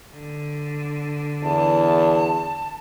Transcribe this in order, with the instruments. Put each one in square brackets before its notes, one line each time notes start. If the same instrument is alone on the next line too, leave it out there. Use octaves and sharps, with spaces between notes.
[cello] D3
[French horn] E2 [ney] A5